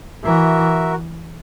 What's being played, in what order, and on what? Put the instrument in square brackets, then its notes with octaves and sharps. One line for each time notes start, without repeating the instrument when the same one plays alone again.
[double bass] E3 [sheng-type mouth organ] F#4 A#4 E5